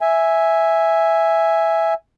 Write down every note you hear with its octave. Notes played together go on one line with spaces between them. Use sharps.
E5 G#5